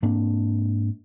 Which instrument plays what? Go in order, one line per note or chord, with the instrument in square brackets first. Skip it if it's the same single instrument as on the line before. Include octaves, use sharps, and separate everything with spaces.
[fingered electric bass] G#2 A#3 C4 D4